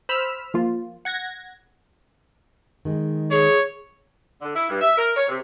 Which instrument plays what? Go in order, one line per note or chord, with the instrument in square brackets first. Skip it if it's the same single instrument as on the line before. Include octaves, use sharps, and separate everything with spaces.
[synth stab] C5 B5 E6 F6
F3 A#3 F4
F#5 G#6 A#6
[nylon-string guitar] D#3 G#3
[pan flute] G#4 [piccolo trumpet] C#5
[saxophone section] D3
E4
G2
E5
A#4
C#5
C3